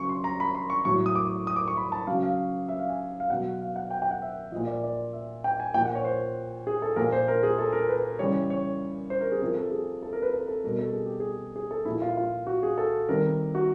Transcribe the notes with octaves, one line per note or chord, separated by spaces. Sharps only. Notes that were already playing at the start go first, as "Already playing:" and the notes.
Already playing: C#3 F#3 C#6
C6
A#5
B5
C6
C#6
A2 F#3 C#6
D#6
D6
D#6
D6
C#6
B5
A5
C#3 F#3 F5
F5
E5
F5
G#5
F5
B2 F#3 F#5
F5
F#5
G5
G5
F#5
E5
A#2 F3 D#5
D5
D5
E5
G5
G#5
A#2 F3 G5
F#5
C#5
C5
G#4
A4
A#2 F3 A#4
C5
A#4
G#4
A4
A#4
B4
C#3 E3 G3 C#5
C#5
C5
A#4
G#4
C3 F3 A#4
A4
G#4
A4
A#4
B4
A4
A4
B2 G3 A#4
A4
G#4
G4
G#4
G#4
A4
A#2 F3 E4
F4
F4
F#4
G#4
A4
C3 D#3 G3 A#4
F#4